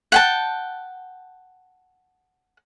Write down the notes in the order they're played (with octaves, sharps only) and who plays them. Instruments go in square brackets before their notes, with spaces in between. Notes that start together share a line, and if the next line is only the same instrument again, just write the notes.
[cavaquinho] F#5 G5 A5